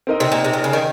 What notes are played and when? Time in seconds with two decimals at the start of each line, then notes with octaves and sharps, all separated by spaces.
0.07 C4 D#4 A#4 D#5
0.20 C3
0.32 A#2
0.44 C3
0.53 A#2
0.64 C#3
0.73 D#3